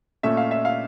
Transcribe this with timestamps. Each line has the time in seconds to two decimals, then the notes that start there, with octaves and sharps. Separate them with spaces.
0.23 A#2 A3 C#4 E5
0.37 F5
0.51 E5
0.65 F5